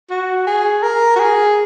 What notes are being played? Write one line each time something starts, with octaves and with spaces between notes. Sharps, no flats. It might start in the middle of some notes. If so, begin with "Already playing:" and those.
F#4
G#4
A#4
F#4
G#4